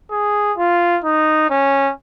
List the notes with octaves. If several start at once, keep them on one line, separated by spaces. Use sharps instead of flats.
G#4
F4
D#4
C#4